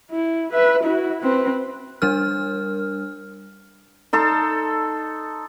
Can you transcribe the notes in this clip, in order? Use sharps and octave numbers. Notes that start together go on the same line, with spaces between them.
E4
B4 E5
E4 F#4
C4 B4
G3 D4 A#4 F6
D#4 A4 C6